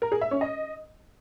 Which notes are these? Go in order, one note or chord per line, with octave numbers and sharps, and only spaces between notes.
A#4
G#4
E5
C#4
D#5